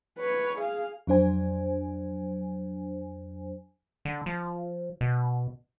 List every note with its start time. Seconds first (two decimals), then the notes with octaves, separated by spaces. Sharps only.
0.18 B4 C#5
0.58 G#4 F5
1.07 F2 F#3 D4 C5 G#5
4.05 D3
4.26 F3
5.01 B2